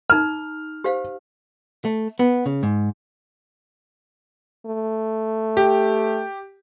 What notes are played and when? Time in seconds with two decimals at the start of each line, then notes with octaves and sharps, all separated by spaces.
0.10 D#4 A#5 F6
0.84 G4 C5 F5
1.85 A3
2.19 B3
2.46 C#3
2.63 G#2
4.66 A3
5.57 G4